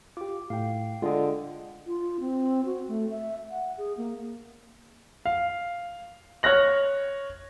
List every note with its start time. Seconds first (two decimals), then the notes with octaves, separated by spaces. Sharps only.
0.17 F4 G4 D6
0.50 A2 F5 G5
1.02 D3 G#3 F4 D#5
1.87 F4
2.20 C4
2.65 F#4
2.88 A3
3.10 E5
3.51 F#5
3.77 G#4
3.97 A#3
5.26 F5
6.43 C#5 F6 F#6 A#6 F#7